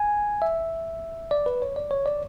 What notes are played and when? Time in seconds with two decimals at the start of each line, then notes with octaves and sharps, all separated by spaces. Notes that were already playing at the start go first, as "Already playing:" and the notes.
Already playing: G#5
0.42 E5
1.31 D5
1.46 B4
1.62 C#5
1.76 D5
1.91 C#5
2.06 D5